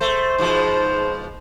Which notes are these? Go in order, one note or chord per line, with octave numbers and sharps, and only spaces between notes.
A3 C5
G#2 B2 F3